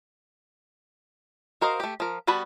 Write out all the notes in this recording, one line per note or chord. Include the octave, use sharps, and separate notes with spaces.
F#4 A#4 C5 D#5 F5
A3 G4
F3 A#4
G3 B3 F#4 B4 A5